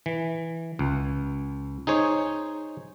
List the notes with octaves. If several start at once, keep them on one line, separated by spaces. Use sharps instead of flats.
E3
C#2
D#4 G#4 C5 C#5